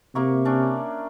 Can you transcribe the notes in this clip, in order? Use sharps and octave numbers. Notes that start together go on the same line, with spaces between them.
C3 A#3 E5 C#6
C#4 D4